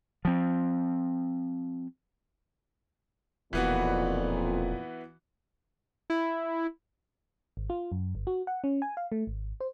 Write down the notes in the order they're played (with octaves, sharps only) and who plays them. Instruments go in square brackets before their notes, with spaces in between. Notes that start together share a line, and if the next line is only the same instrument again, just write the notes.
[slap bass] F3 C4
[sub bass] E1 [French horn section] F2 A#2 [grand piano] E3 B3 F#4
[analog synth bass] E4
[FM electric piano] G#1
F4
F#2
G1
F#4
F#5
C#4
G#5
F5
A3
G#1
C5